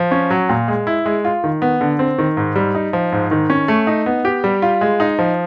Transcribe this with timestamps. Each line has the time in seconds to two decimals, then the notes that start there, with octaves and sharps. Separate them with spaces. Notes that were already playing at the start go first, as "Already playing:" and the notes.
Already playing: F3
0.11 C#4
0.30 F#3
0.49 A#2
0.68 G#3
0.87 E4
1.06 G#3
1.25 F4
1.44 D#3
1.62 B3
1.81 D3
1.99 C4
2.18 D#3
2.37 G#2
2.56 G3
2.75 D#4
2.93 F3
3.12 G#2
3.31 D#3
3.50 C#4
3.68 A3
3.87 D#4
4.06 B3
4.25 G4
4.44 G3
4.62 F4
4.81 G#3
5.00 D#4
5.19 F3